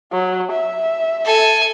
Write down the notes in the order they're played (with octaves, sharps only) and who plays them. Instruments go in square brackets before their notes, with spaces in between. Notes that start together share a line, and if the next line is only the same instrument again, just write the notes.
[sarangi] F#3
E5
[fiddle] A4 G#5